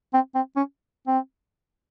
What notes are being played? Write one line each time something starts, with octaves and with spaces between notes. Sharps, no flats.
C4
C4
C#4
C4